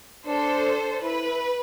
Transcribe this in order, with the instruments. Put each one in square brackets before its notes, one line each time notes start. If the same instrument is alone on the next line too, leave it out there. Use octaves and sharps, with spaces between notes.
[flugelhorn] D4 [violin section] A4 C5
[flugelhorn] E4 [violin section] B4